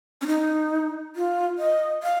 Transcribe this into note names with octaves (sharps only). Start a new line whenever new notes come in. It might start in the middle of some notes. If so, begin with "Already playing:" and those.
C#4
D#4
F4
D#5
F5